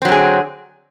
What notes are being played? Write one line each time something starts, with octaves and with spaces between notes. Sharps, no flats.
D3 F#3 C4 G#4